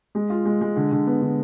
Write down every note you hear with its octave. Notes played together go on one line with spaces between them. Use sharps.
G#3
F4
G#3
G#3
D3
D3
B3
D3